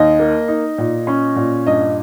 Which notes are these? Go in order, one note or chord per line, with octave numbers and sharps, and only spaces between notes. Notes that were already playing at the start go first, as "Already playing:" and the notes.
Already playing: D#2 D#5
A#3
D#4
A#2
C#4
A#2
G2 D#5